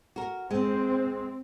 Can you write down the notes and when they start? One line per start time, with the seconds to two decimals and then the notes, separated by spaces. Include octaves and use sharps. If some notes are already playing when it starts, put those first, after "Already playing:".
0.16 F#4 A#4
0.51 G#3 C4